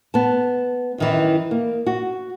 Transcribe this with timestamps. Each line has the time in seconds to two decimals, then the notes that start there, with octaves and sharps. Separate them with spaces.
0.14 B3 A5
0.98 F#2 D#3 E3
1.51 A#3
1.87 F#4